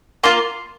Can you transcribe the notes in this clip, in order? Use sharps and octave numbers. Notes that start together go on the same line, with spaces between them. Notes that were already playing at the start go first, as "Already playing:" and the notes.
A#3 F4 C6